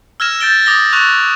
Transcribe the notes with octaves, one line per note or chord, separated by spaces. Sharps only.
E6 F6 G#6 A#6 E7
G6 A6 D7 G7
D6 D#6 A#6 G7
C#6 F#6 A6 F7